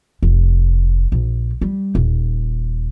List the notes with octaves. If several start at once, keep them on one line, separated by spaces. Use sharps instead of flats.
F1
A#1
G3
D#1